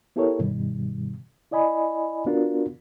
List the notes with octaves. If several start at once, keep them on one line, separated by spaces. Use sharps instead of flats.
B3 E4 G4 A4 A#4 C#5
G2 B2 D#3 G3
E4 D5 D#5 G#5 B5
B3 D4 F4 F#4 A#4